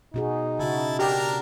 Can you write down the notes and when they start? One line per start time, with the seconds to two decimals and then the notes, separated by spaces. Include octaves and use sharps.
0.14 B2 D#4 F#4 G#4
0.59 C#3 E4 F#4 A5
0.99 D4 G4 A#4 A#5